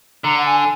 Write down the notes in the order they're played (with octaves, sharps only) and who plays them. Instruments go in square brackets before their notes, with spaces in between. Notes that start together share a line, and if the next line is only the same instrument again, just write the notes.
[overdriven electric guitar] D3 [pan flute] A#5
[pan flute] F#5
G#5
G#5